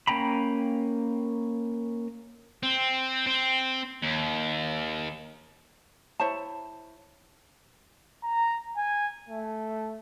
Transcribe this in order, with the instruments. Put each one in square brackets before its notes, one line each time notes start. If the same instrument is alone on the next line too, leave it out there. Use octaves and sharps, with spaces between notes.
[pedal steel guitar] A#3 C#4 G5 A#5 B5
[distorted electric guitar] C4
C4
D#2
[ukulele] E4 C5 C#5 A5
[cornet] A#5
G#5
A3